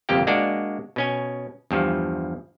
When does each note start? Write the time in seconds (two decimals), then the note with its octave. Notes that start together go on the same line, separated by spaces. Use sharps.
0.09 G1 F2 C3 A#3 G4 G5
0.27 G#3 A#3 D4 F#4 D5
0.96 B2 C#4 G#5
1.71 E2 G2 F3